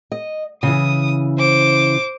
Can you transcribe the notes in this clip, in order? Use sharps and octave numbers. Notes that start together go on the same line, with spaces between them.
D#5
C#3 E3 D#6
C5 D6